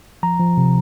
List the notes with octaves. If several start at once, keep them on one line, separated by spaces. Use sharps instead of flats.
F3 A#5
F3
C3